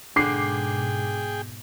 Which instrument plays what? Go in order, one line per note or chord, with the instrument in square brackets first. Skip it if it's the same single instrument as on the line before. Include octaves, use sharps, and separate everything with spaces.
[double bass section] G#2 B2 [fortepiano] D3 [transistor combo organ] G#4 G5 [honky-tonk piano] D6 C7